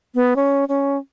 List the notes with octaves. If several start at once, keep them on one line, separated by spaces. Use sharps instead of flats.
B3
C#4
C#4